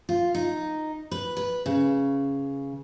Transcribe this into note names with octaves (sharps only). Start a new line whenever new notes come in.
F4
D#4
B4
B4
C#3